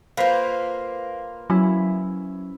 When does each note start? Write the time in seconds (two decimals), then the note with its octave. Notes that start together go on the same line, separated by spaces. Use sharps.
0.17 A#3 F4 B4 C5 G6
1.50 F#3 C#4 E4